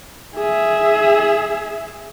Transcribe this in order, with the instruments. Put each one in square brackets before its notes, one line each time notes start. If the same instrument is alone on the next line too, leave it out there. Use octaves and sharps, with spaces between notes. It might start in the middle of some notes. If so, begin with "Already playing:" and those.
[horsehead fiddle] G#4 E5